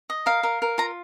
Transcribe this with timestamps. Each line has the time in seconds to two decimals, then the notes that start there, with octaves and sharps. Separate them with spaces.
0.10 D#5
0.26 A#4 F5
0.43 A#4
0.62 A#4
0.78 F4 A#5